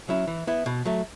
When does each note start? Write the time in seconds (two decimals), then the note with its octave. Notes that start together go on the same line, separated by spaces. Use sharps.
0.09 F#3 C#4 E4
0.27 E3
0.47 B3 E4
0.66 B2
0.85 F#3 A3